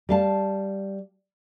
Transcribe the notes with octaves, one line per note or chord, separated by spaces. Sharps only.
G3 F5 A5